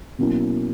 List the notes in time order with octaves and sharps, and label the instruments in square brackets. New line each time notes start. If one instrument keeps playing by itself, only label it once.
[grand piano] B2 F#3 A#3 C#4 E4